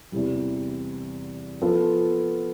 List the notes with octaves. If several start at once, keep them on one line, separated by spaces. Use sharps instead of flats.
E2 C3 E3 G3
F3 B3 F4 A4